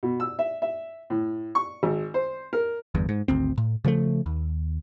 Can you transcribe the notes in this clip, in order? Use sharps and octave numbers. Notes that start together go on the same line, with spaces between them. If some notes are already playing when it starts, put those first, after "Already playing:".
B2
E6
E5
E5
A2
C#6
G#1
C5
A#4
G1 E2 G2
G#2
G#1 D2 C4
A2
C#3 F3 F#3 A3
D#2